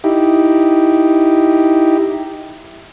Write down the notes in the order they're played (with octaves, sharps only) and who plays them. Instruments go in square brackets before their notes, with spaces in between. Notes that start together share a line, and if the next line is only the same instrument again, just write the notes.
[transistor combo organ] D#4 E4 G4